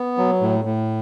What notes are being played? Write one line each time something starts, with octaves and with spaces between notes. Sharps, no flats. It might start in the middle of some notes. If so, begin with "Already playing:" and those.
Already playing: B3
F#3
A2
A2